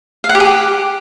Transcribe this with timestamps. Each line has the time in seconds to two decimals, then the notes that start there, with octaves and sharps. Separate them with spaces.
0.24 F5
0.29 F#5
0.35 G4
0.40 G#4
0.46 G4